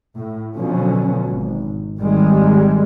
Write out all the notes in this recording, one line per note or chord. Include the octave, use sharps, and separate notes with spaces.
A2
B2 D3 F3 F#3 C#4
G#1
G#1 D#3 G3 G#3